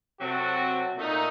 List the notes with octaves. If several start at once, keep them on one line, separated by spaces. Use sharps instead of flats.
C3 F#3 C4 F#4 A4
A#2 A3 D#4 A#4